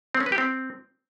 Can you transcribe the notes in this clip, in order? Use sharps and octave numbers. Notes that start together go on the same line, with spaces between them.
C4
C#4
B4
G4
C4